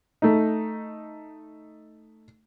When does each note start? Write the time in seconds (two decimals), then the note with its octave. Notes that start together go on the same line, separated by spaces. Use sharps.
0.22 A3 D#4